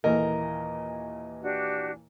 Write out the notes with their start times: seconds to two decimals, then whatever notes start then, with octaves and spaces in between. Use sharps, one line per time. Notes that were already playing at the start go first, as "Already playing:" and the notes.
0.04 D#2 A#2 E3 A#4 D#5
1.43 D4 F#4 G4